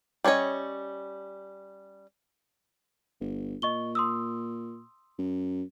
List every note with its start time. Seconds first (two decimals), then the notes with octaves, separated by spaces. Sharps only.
0.24 G3 C#4 C5 C#5 D#5
3.21 G1
3.62 A#2 D#5 C#6 G7
3.95 C6 D#6 E6
5.18 F#2